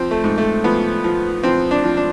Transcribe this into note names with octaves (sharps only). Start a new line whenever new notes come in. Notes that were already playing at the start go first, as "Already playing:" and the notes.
Already playing: F3 C4
A3
G#2
A3
F3 B3
F3
F3 C4
D4
F3
D4